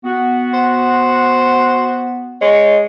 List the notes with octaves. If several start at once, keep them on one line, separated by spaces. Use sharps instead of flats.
B3 F#4
C5
G#3 C#5